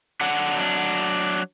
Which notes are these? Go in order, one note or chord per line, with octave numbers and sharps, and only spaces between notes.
F#3 D4 F#5